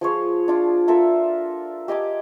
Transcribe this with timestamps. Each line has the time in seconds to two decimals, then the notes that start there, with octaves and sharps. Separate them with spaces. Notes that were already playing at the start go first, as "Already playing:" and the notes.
0.01 F3 G#4 C#5 C6
0.48 D4 F4 D5
0.88 F4 A4 A#4 E5
1.88 G4 D#5 G#5 D6